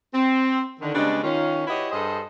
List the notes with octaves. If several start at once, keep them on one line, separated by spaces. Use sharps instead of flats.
C4
D3 D#3
C#3 G3 G#3 B3 D4
D#3 C#4 F4
E4 F#4 G4 B4 C#5 D#5
G2 G#4 A4 C5 D#5